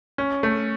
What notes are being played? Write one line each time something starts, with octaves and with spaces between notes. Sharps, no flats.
C#4
A3